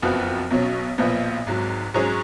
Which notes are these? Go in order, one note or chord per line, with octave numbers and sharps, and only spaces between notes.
F#1 F2 F3 B3 F#4
B1 B2 F#3 C#4
B1 A#2 F3 B3
G#1 G#2 F#3
G#2 F#3 C#4 G#4 C#5